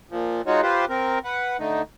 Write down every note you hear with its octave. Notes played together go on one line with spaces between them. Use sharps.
A#2 F3
G#3 D#4 F4 F#4 C#5
F4 G4 B4 C5
C4 A#4
B4 F#5
D3 A3 D#4